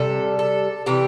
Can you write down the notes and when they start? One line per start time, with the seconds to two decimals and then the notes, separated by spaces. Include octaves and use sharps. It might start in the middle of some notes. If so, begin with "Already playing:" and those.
Already playing: C3 G3 A4
0.39 A4
0.86 C3 E3 G3 G4